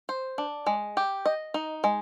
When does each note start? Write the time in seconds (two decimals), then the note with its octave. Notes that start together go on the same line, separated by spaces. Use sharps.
0.09 C5
0.38 D4
0.66 G#3
0.97 G4
1.26 D#5
1.54 D#4
1.84 G#3